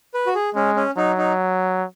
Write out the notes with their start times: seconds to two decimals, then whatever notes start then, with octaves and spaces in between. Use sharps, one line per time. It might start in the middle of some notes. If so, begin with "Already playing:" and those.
0.14 B4
0.26 F#4
0.35 G#4
0.55 G#3 C#4
0.76 C#4
0.97 F#3 D#4
1.18 D#4